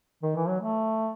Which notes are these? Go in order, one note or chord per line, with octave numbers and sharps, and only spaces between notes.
D#3
E3
F#3
A3